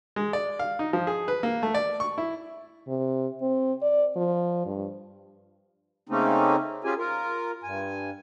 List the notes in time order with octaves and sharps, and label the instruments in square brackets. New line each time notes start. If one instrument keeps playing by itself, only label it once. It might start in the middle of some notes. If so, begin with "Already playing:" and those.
[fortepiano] G#3
D5
F5
D#4
F3
G#4
B4
A#3
A3
D5
C#6
E4
[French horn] C3
C4
D5
F3
G2
[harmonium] C#3 A3 A#3 C4 C#4 D#4
C#4 F4 G4 G#4 G#5
F4 A#4
G2 G#5